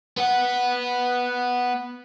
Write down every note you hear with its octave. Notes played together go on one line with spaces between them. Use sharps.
B3 F#5